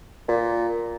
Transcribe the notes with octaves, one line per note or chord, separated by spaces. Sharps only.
A#2